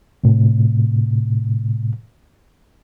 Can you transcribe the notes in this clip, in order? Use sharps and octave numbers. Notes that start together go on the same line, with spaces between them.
A2 C3